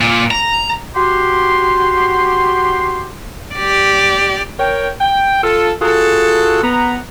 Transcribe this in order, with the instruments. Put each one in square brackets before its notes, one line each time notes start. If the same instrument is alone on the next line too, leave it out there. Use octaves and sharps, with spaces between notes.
[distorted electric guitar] A#2
A#5
[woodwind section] F#4 G4 C6
[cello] G4 D5
[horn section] A#4 C#5 G5
G5
F4 A4
F4 F#4 G#4 A4
B3 A#5